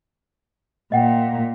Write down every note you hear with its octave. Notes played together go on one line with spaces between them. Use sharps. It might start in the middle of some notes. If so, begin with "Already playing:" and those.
A#2 D#5 F#5 G5